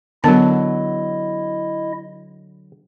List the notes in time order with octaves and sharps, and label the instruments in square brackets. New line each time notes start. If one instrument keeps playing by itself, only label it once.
[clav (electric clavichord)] D3 F#3 [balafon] B3 A#4 A5 [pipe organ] E4 D#5